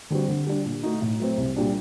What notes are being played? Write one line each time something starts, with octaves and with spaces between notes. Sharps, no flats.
D3 G3 C4 F#4
D3
G3 D4
A#2
A3 D#4 F#4
A2
F#3 A3 C4
C2
A#2 G3 D4 F#4